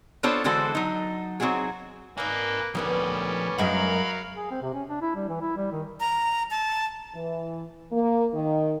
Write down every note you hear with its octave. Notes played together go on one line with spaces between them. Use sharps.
B3 D4 F4 A4 C5 C#5
D3 E3 G#3 F#4 A4 C5
F#3 D#4
F#3 C4 D#4 F#4 G#4
A#3 D4 D#4 A#4 B4 G#5
D2 F3 G3 B3 C#4 D#4 A#4 B4
F#2 F#3 G#3 A#4 F5 B5
G#4
C4
C3
C#4
D4
E4
G3
E3
E4
G3
D#3
A#5
A5
E3
A#3
D#3